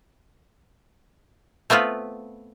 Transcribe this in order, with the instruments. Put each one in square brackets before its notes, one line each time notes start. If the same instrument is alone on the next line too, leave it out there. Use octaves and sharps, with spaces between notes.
[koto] A3 B3 C4 F4 B4